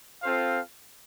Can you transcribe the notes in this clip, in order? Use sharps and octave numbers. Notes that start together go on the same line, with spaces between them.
C4 F4 A4 C5 F5